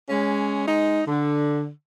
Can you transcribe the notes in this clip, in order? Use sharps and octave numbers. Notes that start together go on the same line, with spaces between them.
G#3 C#4
G#3 D#4
D3